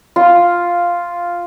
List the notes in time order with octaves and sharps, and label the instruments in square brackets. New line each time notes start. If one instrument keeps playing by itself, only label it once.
[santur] F4